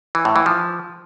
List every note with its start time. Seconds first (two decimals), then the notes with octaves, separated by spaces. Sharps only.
0.15 E3
0.25 A2
0.36 E3
0.46 F3